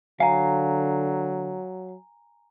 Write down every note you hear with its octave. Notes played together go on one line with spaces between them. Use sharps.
D3 F#3 F5 G#5 A#5